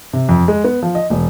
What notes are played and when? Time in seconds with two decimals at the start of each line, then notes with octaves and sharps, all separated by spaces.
0.13 C3
0.29 F2
0.48 G#3
0.64 B3
0.83 F3
0.95 D#5
1.10 E1